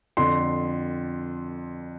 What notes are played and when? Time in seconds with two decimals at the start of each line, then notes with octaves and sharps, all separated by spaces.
0.17 F2 D3 C6